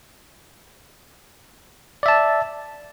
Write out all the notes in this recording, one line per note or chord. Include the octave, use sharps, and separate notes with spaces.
D5 E5 A5